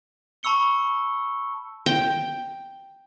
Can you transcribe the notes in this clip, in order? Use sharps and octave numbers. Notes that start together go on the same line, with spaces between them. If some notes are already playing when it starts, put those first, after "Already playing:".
A5 B5 C#6 E6 C#7 G7
G5